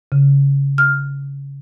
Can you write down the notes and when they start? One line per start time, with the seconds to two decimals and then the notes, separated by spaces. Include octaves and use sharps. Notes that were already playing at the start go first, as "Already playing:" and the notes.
0.12 C#3
0.78 F6